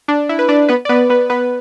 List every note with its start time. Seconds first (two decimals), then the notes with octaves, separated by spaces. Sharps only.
0.08 D4
0.29 E4
0.39 B4
0.49 D4 D5
0.69 B3 B4
0.85 D5
0.89 B3 B4
1.10 B3 B4
1.30 B3 B4